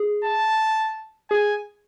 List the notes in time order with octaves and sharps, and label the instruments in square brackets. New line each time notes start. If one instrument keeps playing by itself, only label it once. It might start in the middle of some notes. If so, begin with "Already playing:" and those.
Already playing: [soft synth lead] G#4
[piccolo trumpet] A5
[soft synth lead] G#4 [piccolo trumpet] G#5